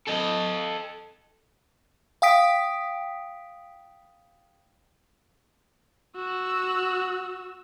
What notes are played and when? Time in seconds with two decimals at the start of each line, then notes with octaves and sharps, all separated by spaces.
0.08 A4 D#5
2.22 F5 G5 D#6 B6 D7
6.16 F#4 E6